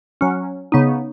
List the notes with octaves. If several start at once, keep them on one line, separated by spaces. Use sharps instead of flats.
F#3 C#4
C#3 B3 D#4